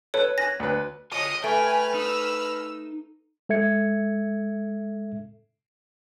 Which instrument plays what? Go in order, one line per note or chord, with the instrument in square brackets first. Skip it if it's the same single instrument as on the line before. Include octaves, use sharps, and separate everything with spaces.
[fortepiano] A4 B4 [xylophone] C#5
[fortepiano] G#5 F#6 [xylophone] A#6
[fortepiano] D2 B4
[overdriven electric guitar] F4 C#5 [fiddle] D#5 [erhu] D#6
[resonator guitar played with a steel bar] A3 [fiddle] B4 F6 [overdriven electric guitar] G5 [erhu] G#5
[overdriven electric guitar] D#4 [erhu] E6
[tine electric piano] G#3 A4 E5 G#6 C#7